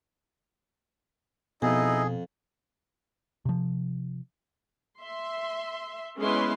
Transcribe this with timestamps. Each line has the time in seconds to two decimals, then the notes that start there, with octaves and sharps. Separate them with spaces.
1.62 F2 B2 D#4 E4 G#4 D#5
3.45 C3 F3
4.99 E5 C6
6.19 G#3 B3 C#4 E4 B4 C6